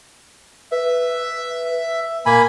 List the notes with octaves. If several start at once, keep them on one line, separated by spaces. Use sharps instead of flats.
B4 E5
A#2 A#3 G#5 B5